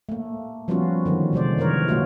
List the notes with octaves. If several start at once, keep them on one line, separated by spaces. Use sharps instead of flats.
A3 A#3
F3 G3 B3 C#4 F4 F#4
D3 D#3 F#3
C3 G#3 C5 D5
D#3 E3 G#3 A#4 C#5
B2 F#3 A3 A#3 F4 F#4